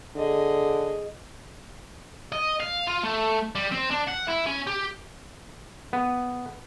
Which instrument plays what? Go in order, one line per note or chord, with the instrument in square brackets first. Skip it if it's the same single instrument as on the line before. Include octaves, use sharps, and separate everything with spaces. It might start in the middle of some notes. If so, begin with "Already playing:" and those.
[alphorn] D3 [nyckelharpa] G#4 D#5
[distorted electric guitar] D#5
F5
F4
A3
G3
C4
D4
F#5
E4
C#4
G4
[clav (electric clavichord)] B3